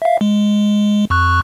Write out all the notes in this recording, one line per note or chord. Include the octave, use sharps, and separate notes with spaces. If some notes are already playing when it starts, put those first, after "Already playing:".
E5 F5
G#3
F2 C#6 F#6